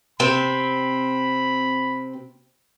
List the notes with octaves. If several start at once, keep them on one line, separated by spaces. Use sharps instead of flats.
C3 C4 B5